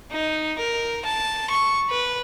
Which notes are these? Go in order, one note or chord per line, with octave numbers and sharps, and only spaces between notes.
D#4
A#4
A5
C#6
B4